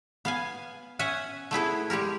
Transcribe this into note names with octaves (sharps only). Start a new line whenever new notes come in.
B3 F5 G#5
C#4 E5 F#5 G#5
A3 B3 E4 G#4
G3 G#3 G4 A#4